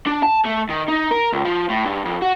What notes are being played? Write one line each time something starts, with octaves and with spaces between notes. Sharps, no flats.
D4
A5
A3
D#3
D#4
A#4
C#2
F3
A2
G2
F2
F#4